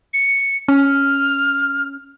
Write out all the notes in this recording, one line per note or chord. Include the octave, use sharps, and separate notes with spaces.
C#7
C#4 F6